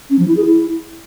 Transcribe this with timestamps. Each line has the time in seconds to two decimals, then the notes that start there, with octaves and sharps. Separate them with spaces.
0.10 C#4
0.19 F3
0.28 E4
0.37 G#4
0.45 E4